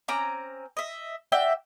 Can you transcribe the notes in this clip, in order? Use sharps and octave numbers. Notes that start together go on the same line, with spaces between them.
C4 C#4 A#5 D6
D#5 E5
F#4 D5 E5 G5